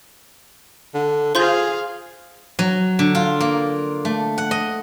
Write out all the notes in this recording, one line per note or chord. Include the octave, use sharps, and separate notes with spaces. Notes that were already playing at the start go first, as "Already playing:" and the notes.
D3
F4 G#4 C5 F5 C6 G6
F#3
D3
F4
A#3
A3
F#5
D#5